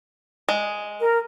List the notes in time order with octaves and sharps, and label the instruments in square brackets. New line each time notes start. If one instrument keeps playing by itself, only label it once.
[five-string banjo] G#3
[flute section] A#4